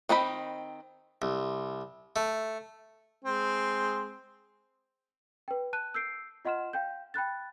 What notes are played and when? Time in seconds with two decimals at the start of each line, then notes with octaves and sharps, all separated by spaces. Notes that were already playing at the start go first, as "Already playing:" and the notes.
0.09 D#3 C4 D#4 B5
1.22 C2
2.16 A3
3.24 G#3 C4
5.48 B4 G5
5.73 A5 F#6 D#7
5.94 E6 G6 C7 D7
6.45 F4 D#5 F#5 C6 F6 E7
6.73 F5 G5 G6
7.14 G5 B5 F#6 A6